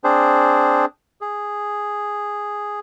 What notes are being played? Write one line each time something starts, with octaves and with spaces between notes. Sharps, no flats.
C4 D4 G#4 C5
G#4